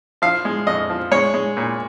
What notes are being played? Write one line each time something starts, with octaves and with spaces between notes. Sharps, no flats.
F3 F5
G#3
F2 D#5
F3
G#3 C#5
G#3
A#2